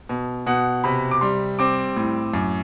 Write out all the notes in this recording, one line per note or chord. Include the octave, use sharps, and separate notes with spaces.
B2
B2 F#5
C3 B5
D6
G3 C6
C4 D6
A2
F#2